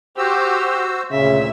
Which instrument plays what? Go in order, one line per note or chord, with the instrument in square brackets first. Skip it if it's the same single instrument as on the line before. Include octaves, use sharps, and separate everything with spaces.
[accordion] F#4 C5 E6 [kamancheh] G4
[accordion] D2 A#2 [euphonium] C#3 [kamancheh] E5